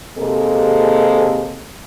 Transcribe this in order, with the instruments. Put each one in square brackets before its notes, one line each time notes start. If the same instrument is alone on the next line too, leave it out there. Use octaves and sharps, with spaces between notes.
[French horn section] D#2 C3 G#3 A#3 A4